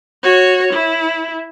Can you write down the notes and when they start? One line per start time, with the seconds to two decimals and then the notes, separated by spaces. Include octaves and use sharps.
0.23 F#4 C#5
0.73 E4